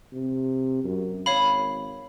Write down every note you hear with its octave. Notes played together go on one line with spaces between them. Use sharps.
C3
F#2
G#1 C#5 F5 B5